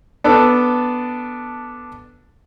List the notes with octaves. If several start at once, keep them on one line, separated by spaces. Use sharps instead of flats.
B3 D4 A4